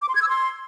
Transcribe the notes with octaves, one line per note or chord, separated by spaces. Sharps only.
D6
C6
G#6
E6
C6